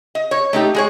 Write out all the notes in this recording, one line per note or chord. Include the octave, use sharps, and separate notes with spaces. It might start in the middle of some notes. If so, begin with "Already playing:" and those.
D#5
C#5
A3 D#4 G4
G#3 G#4 C#5